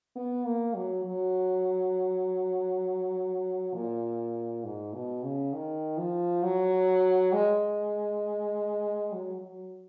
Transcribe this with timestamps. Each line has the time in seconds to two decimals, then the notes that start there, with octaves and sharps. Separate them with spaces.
0.16 B3
0.46 A#3
0.75 F#3
1.05 F#3
3.74 A#2
4.64 G#2
4.93 B2
5.23 C#3
5.53 D#3
5.98 F3
6.43 F#3
7.33 G#3
9.12 F#3
9.42 F#3